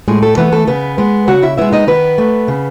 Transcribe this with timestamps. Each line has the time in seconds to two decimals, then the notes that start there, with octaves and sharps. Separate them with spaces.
0.08 A2 G#3 G#4
0.22 A3 A4
0.37 E3 A3 B3 B4
0.52 A3 A4
0.67 C#3 B3 B4
0.98 G#3 B3
1.28 C#3 F#4 F#5
1.43 E4 E5
1.58 G#3 B3 E4 E5
1.72 D#4 D#5
1.88 D#3 B3 B4
2.18 A3
2.48 C#3